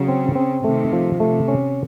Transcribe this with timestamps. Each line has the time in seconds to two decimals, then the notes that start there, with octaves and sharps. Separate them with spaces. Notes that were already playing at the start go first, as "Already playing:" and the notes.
Already playing: C#3 F#3
0.08 C4
0.35 C4
0.64 C3 D#3 A3
0.92 F3
1.20 C3 A3
1.48 C#4